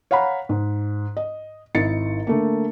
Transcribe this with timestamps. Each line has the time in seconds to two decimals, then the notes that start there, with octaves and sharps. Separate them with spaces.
0.11 C#5 F5 F#5 A#5 B5
0.49 G#2
1.17 D#5
1.75 G#1 D#4 E4 A6 C#7
2.27 D3 A3 A#3